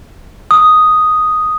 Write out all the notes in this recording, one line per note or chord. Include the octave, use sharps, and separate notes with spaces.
D#6